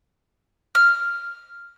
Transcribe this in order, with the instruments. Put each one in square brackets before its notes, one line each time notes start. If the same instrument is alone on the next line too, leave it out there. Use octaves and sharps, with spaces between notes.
[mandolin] F6